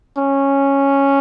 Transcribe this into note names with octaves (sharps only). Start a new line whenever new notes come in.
C#4